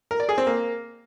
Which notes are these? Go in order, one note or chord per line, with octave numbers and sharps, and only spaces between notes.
A#4
D5
G#4
C4
A#3